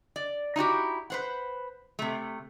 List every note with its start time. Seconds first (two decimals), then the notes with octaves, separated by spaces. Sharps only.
0.16 D5
0.56 D#4 E4 F#4 G4
1.10 B4 C5 F#5
1.99 C3 A3